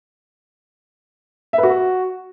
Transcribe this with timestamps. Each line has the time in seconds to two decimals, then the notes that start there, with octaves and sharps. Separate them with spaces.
1.53 E5
1.58 B4
1.63 F#4